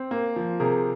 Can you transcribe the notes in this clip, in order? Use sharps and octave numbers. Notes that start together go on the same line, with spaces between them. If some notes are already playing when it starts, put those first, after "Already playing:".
Already playing: C4
A#3
F3
C3 G#4 A#4